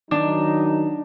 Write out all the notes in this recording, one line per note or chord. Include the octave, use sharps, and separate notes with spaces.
D#3 F#3 D4 D#4